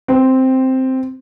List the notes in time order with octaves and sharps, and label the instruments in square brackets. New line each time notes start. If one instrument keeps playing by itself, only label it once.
[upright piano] C4